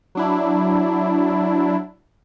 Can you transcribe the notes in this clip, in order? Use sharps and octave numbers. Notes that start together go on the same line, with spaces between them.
F#3 D4 E4